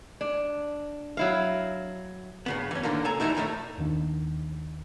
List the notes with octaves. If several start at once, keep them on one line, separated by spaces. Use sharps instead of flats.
D4
F#3 E4 F5
G2 C#3 B3
E3 C#4
B1 D3 D#3 A#3
C#3 A4 G#5 A#5
E3 G3 G#3 A#3 D#4 E4
B1 F2 D#3 G#3 A3 D#4
D#2 D#3 D4